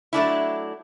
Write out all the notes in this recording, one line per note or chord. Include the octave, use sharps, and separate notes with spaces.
F#3 A3 D4 E4